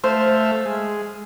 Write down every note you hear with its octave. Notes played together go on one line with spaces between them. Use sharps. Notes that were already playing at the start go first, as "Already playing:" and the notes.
A3 C5 E5 F5
G#3